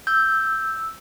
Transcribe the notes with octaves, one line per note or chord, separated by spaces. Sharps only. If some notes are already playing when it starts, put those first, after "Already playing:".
E6 G6